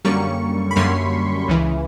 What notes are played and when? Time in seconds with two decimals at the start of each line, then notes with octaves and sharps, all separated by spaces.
0.05 F#2 D3 G3 A#3 C#4 C#6
0.71 B5
0.76 F#2 D3 G3 A#3 C#4 C6
1.48 C#2 C#3 E3